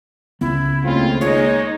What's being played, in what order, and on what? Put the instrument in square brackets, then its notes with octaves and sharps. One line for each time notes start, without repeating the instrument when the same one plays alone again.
[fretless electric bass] C#2 B3 [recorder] E4
[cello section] D#2 C#3 A3 [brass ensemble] C4 F4
[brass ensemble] G#3 [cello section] A#3 D#4 [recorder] C#5